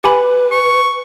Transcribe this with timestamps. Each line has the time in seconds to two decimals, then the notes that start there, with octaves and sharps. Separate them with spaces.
0.04 G4 B4 G#5 B5
0.52 C#6